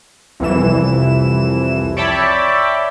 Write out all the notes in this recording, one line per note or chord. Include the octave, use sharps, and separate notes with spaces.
C2 F2 E3 E7
C#5 D5 E5 G5 A5 B5